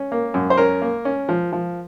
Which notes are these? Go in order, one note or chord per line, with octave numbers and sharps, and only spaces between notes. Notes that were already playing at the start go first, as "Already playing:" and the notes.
Already playing: C#4
A#3
F#2
C5
C#4 A#4
A#3
C#4
F3
F3